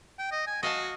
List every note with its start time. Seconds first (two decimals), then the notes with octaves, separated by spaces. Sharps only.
0.19 G5
0.32 D#5
0.47 G#5
0.63 F#4 D#5 F5 A5